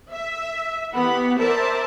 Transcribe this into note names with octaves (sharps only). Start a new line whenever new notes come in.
E5
E3 B3 G4 F#5 B5
A#4 C5 D5 E5 A5